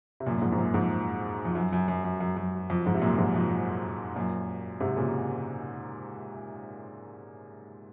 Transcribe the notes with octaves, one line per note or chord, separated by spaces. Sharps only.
C3
F#2 A#2
A#2
F2 G#2
G#2
F#2 A#2
F2 G#2
F2
F#2
F#2
F#2
F#2
F#2
F#2
F2
F2 G#2
C3
F#2 A#2
F2 G#2
F2
F#2
F#2 A#2
G#2 C3
A#2 C#3